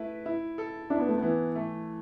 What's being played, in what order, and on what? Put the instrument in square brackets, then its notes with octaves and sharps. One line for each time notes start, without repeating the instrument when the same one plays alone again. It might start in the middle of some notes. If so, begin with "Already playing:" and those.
Already playing: [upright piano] A3 E4 B4
E4
A4
[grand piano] D4 [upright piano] E4
[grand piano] B3
A3
[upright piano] E3 [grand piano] B3
[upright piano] A3